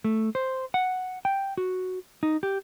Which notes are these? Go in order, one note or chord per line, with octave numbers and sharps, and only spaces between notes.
A3
C5
F#5
G5
F#4
D#4
G4